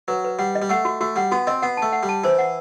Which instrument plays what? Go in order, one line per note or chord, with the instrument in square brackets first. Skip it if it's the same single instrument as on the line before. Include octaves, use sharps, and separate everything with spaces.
[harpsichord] F#3 [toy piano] B4
[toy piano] B4
[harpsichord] G3 [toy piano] F#5
[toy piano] D#5
[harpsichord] G3
[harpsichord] A3 [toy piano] F#5
[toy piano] F#4
[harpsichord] A3 [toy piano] F#4
[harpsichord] G3 [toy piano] F#5
[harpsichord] B3 [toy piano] F#4
[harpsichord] C4 [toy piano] D#5
[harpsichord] B3 [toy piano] F#5
[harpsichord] A3 [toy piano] A5
[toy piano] F#5
[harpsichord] G3
[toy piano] A5
[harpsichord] E3 [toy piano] C5
[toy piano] F#5